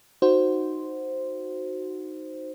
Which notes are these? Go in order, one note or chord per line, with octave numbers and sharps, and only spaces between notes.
D#4 F#4 C5